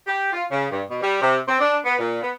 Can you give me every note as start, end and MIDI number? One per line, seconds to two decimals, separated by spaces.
0.07 0.31 67
0.33 0.44 65
0.51 0.66 49
0.71 0.82 43
0.89 0.98 47
1.02 1.19 55
1.22 1.38 48
1.47 1.59 60
1.60 1.77 62
1.85 1.99 59
1.99 2.21 46
2.22 2.31 59